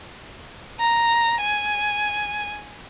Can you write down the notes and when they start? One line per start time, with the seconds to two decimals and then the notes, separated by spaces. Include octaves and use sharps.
0.80 A#5
1.41 G#5